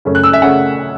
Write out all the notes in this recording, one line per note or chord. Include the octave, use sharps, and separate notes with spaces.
F#2 C#3 A3 C#4
F#6
E6
E5
C#3 A3 C#4 F#5